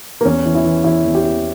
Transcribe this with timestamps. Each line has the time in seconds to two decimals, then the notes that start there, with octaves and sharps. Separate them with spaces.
0.21 A#3
0.25 E2 C#4
0.46 E3
0.55 E4
0.64 E3
0.84 E2 E4
1.05 E2
1.14 G4
1.24 E3